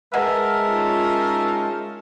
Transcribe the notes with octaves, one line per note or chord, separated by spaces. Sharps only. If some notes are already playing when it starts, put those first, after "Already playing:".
G#3 A#4 B4 D#5 E5 F#5 A5
C#4 D#4 F4